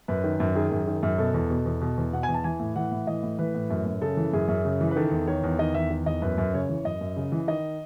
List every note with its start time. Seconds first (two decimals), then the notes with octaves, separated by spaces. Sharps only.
0.08 F#2 B4
0.24 D#3
0.40 F#2
0.55 D#3 G#4
0.72 F#2
0.87 D#3
1.03 F#2
1.18 B2 A4
1.34 E2
1.50 B2
1.66 E2
1.81 B2
1.97 E2
2.13 B2 F#5
2.23 G#5
2.28 E2
2.34 A5
2.44 E3 G#5
2.59 A2
2.76 E3 F#5
2.92 A2
3.07 E3 D#5
3.23 A2
3.39 E3 B4
3.55 A2
3.70 F#2
3.86 F#2
4.02 C#3 A4
4.17 E3
4.33 F#2 G#4
4.48 F#2
4.65 C#3
4.81 E3
4.91 B4
4.96 D#3 A4
5.11 E2
5.27 D#3 C#5
5.44 E2
5.59 D#3 D#5
5.75 E2 E5
5.90 D#3
6.06 E2 D#5
6.22 F#2 B4
6.38 F#2
6.54 C#3 C#5
6.69 E3
6.85 F#2 D#5
7.01 F#2
7.16 C#3
7.32 E3
7.48 D#3 D#5